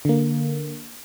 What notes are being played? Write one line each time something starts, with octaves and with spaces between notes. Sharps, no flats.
D3 A#3